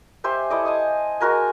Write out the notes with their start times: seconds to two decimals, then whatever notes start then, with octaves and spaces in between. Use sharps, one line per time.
0.24 G4 C5 E5 G#5
0.50 E4 A4 D5 D#5
0.65 G#5 A5 D#6
1.21 G#3 F#4 A#4 G#5